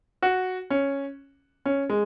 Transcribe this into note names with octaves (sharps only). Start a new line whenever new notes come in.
F#4
C#4
C#4
G#3